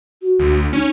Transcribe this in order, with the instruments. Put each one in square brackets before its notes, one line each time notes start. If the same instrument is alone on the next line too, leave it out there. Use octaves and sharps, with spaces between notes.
[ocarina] F#4
[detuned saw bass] D2
[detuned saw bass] C#4 [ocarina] D#4